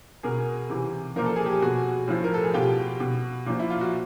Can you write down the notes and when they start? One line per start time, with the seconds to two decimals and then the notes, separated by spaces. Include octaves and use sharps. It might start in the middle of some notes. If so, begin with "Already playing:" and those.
0.23 B2 G#4 A#4
0.69 C3 E3
1.16 A#2 F3 A#4
1.26 A4
1.36 G#4
1.46 G4 A4
1.62 B2 F#4 G#4
2.08 A2 F3
2.24 A#4
2.34 A4
2.44 G#4
2.54 B2 F4 G4
3.00 B2
3.46 A#2 F3
3.59 E4
3.70 F4
3.81 F#4